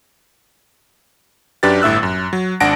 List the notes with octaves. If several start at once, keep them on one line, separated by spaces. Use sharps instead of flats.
F#2 D4 G4 B4 A6
G1 A2 E5 E6 F#6
F#2
F#3
G#1 D4 F#5 A5 A#6 D7